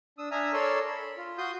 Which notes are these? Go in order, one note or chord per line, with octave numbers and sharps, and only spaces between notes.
D4 D#6 E6
D4 E5 G#5 A#5 D#6 F6
A4 A#4 C#5 D5 C6 E6
B5
F4
F#4 C6 D#6 G6